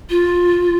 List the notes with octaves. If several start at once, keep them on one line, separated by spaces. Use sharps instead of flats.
F4